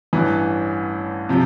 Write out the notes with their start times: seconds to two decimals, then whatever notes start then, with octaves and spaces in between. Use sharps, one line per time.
0.13 A1 G2 E3
1.29 C3 F3